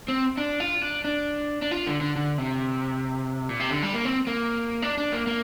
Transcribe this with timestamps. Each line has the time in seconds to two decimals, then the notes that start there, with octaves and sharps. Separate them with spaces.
0.08 C4
0.38 D4
0.60 F4
0.82 D4
1.04 D4
1.62 D4
1.71 F4
1.86 D3
2.01 D3
2.15 D3
2.38 C3
3.49 A#2
3.60 C3
3.71 D3
3.82 G3
3.94 A#3
4.05 C4
4.27 A#3
4.82 D4
4.97 D4
5.12 A#3
5.27 A#3